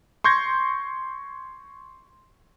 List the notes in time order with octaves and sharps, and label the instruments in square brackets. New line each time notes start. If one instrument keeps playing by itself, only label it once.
[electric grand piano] C6 C#6 G6 G#6 A#6